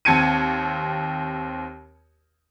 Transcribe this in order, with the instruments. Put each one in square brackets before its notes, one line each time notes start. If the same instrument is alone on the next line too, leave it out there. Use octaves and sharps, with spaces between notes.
[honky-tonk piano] D#2 C4 A5 G#6 C#7 D#7